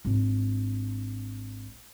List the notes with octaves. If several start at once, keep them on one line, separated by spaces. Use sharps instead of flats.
G#1 D4